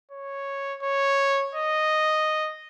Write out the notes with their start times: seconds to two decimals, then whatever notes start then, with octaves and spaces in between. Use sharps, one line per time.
0.11 C#5
0.83 C#5
1.55 D#5